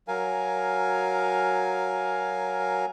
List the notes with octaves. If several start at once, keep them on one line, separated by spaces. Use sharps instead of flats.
F#3 A#4 F5 G#5